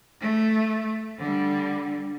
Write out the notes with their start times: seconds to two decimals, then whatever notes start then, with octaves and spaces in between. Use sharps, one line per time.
0.20 A3
1.18 D3 G3